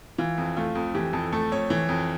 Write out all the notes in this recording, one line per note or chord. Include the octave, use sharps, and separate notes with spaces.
E3 F4
F2
A3 F4
F2
E3 G4
F2 A4
A3 A4
F2 C#5
E3
F2